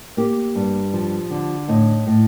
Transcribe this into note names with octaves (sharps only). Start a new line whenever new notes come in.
A#3 G4
G2
F3
D3
A2 D#4
A2